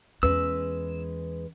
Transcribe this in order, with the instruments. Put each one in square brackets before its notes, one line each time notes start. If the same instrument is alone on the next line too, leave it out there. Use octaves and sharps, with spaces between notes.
[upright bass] E2 C#4 [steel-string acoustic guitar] G#3 B4 [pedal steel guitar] E6